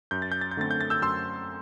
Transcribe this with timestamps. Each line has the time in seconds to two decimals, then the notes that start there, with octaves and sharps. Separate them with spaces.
0.11 F#2 G6
0.22 A6
0.32 G6
0.41 A6
0.51 G6
0.57 D3 A3 C4 A6
0.71 G6
0.81 A6
0.90 E6 G6
1.02 F#2 C6 E6